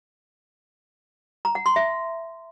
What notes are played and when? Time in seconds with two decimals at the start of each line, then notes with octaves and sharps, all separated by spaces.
1.45 A#5
1.55 F#5
1.66 C6
1.76 E5